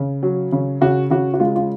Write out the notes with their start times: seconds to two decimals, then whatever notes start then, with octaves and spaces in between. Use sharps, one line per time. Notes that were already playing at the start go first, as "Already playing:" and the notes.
Already playing: C#3
0.23 F#3
0.52 C#3
0.81 C#3 F#4
1.10 C#3 F#4
1.34 F#4
1.40 G#3 F4
1.56 F4